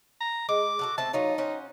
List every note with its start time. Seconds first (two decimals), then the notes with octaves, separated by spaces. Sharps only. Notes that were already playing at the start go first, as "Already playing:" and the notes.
0.21 A#5
0.49 G#3 D6
0.79 F#4 A4 F#5
0.98 A3 C4 E5 A5
1.13 F#3 D#4 F4 C#5
1.38 C#4 C5 F#5